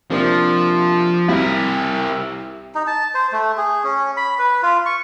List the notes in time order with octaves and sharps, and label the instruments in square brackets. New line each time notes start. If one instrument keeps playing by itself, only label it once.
[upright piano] C3 A#3 D4 [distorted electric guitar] F3
[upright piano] C2 C3 [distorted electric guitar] E4 A#4
[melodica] D#4
A5
C5
A3
G#4
C#4
B5
B4
F4
C#6